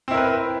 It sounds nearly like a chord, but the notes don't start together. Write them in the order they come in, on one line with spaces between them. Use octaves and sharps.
C4 E4 A#4 B4